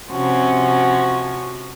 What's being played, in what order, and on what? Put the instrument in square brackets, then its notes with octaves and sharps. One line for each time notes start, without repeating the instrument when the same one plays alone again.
[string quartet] C3 F3 C#4 F#4